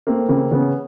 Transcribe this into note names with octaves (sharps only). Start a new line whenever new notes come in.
A3 A#3 C4
C#3 A#3 C4
C#3 B3 C#4